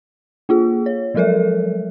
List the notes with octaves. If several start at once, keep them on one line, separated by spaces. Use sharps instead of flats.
A#3 F4 G#4
C#5
F3 F#3 G#3 A4 A#4 E5